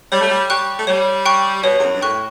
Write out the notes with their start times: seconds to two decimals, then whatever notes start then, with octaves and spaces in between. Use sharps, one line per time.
0.12 G3 C#5
0.21 A3
0.30 G3
0.49 G3 G5 C#6 F#6
0.79 A3
0.87 G3 C#5
1.26 G5 C#6 F#6
1.63 B2 C#5
1.78 E2
1.83 F#2
1.95 G2
2.01 A2 G5 C#6 F#6